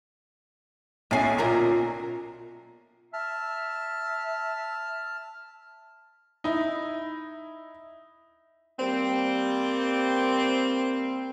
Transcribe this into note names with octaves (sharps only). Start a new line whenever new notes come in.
B1 A2 C#4 G#5 C7
A#2 F4 A#4 A#5
E5 A5 F6
D#4 E4
G3 A#3 C4